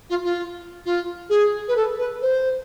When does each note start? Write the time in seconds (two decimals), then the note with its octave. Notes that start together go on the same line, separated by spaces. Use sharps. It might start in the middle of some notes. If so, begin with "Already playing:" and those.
0.09 F4
0.23 F4
0.85 F4
1.29 G#4
1.68 B4
1.75 A4
1.97 B4
2.21 C5